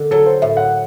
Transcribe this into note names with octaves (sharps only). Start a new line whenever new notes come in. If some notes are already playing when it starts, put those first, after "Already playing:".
Already playing: D3
F#3 A4
C5
A2 E5
F#5